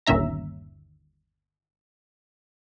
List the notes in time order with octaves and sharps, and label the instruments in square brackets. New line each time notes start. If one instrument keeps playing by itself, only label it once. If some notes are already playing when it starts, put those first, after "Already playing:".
[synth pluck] G1 D#2 A#2 C#4 E5 A#5